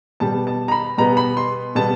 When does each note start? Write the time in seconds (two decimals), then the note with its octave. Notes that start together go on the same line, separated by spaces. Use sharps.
0.20 B2 G3 B3 A5
0.47 A5
0.68 A#5
0.72 B5
0.98 B2 G3 B3 A#5
1.17 B5
1.37 C6
1.75 B2 G3 B3 A5